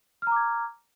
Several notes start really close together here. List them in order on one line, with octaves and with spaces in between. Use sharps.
F6 A#5 D6 G#6